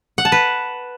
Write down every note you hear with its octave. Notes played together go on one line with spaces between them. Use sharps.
F#5
A5
B4